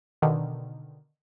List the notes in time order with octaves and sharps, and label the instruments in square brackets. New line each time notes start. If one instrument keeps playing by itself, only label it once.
[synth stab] B2 D3 D#3